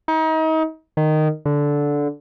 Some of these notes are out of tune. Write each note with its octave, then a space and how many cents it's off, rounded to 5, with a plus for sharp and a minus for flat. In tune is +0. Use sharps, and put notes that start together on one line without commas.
D#4 +35
D#3 -10
D3 -10